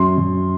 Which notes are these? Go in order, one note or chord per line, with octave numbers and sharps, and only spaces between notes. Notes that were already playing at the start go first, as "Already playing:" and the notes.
Already playing: F#2 C6
F#2